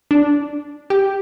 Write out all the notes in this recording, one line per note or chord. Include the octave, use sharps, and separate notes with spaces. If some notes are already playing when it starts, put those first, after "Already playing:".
D4
G4